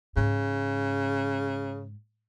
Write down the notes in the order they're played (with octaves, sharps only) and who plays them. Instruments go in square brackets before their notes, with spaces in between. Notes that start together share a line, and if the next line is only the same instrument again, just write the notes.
[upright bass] G#2 [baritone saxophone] C#3